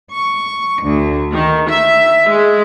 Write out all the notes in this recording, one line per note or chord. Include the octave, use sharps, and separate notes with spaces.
C#6
D2
D#3
E5
G#3